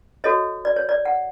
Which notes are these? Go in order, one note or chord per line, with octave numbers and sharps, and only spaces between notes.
F#4 A4 C#5 D#5
D5
C#5
D5
F#5